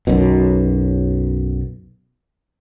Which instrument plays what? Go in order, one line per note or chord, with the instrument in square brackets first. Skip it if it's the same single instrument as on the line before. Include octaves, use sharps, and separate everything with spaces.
[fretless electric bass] B1 F#2 B2